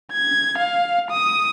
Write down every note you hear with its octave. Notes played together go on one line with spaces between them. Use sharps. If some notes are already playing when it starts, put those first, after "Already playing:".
G#6
F5
D#6